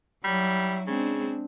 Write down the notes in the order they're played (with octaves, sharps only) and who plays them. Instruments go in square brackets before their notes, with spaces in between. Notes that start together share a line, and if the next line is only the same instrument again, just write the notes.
[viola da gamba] F#3 E4 [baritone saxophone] G3
[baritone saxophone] C#3 [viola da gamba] G#3 C4 D4